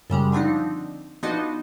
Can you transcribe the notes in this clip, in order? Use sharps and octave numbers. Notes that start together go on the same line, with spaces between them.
F#2 C#3 G3 G#3
D3 F3 C4 D4 D#4
F3 B3 D4 D#4 F#4 D#5